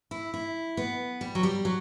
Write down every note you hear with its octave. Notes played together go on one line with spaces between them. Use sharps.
E4
E4
B3
G3
F#3
G3
F#3